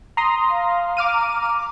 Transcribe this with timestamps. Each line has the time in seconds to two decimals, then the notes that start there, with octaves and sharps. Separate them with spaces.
0.17 A#5 C6 D#6
0.49 F5
0.97 D6 F6 D#7
1.13 A#5
1.54 D6